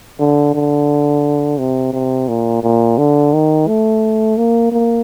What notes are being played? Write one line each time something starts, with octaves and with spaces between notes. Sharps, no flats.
D3
D3
C3
C3
A#2
A#2
D3
D#3
A3
A#3
A#3